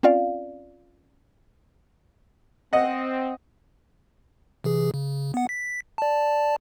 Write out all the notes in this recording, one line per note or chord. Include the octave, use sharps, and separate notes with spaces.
C4 C#4 F4 D5 F5
C4 D#5 F#5
C3 E3 G#4
C#3
B3 F#5
B6
D5 A5